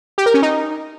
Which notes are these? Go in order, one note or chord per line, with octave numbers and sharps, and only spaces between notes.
G4
A#4
C#4
D#4